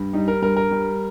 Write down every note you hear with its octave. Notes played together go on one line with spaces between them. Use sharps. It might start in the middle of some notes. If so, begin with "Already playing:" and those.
Already playing: G2
G3 D#4
A#4
G2 A#4
A#4
G3